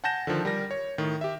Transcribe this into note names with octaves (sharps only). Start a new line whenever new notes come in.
F#5 G#5 A5 G6 A#6 E7
D3 D#3 F3
G3 A#4 A#6
C#5
A2 D#3
G4 E5